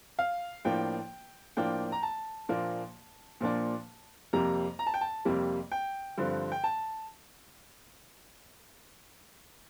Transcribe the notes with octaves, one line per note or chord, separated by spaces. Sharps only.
F5
A2 F3 A#3 D4 G5
A2 F3 A#3 D4 G5
A#5
A5
A#2 F3 A#3 D4
A#2 F3 A#3 D4
F2 C3 G3 A#3 A#5
A#5
A5
G5
A5
F2 C3 G3 A#3
G5
G2 D3 F3 C4
G5
A5